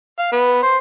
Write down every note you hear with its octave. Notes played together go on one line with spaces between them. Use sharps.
F5
B3
C5